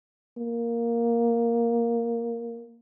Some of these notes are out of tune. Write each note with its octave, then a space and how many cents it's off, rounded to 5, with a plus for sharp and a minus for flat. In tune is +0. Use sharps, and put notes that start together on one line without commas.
A#3 +0